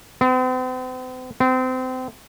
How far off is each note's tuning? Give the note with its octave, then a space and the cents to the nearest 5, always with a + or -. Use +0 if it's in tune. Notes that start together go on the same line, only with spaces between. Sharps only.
C4 -45
C4 -30